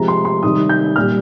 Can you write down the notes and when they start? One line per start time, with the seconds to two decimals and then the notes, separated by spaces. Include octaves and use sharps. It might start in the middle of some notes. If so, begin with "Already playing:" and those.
Already playing: C3 F3 G#3 A#5
0.08 C6
0.25 C6
0.43 C3 D#3 G3 D#6
0.69 G6
0.96 A#2 G3 F6